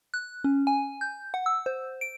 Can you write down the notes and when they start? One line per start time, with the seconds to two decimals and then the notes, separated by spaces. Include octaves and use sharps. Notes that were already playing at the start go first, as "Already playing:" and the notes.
0.14 F#6
0.44 C#4
0.67 G#5
1.01 G6
1.34 F#5
1.46 E6
1.66 C5
2.01 D7